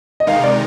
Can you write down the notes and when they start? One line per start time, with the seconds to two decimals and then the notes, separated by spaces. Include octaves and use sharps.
0.20 D#5
0.27 C3 D#3 G#3 D#4 A#4 F5
0.44 D5